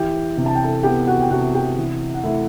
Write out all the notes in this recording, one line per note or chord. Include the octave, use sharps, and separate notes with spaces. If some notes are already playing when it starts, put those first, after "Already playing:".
Already playing: E3 G4 G5
C3
A5
G5
A4 A5
B3 G4 G5
F#4 F#5
G5
C3 F#4 F#5
G4 G5
E3
F#5
A3 E4 E5